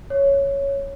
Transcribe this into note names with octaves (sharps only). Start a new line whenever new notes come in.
C#5